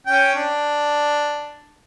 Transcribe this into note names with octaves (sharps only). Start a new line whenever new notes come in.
C#4 G5
D4